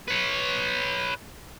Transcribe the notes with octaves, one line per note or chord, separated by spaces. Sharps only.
B4 C#5